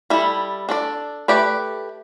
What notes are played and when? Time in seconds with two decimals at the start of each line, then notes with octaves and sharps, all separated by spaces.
0.10 G3 E4 A4
0.69 D4 A4 D5
1.28 A3 G4 B4 D5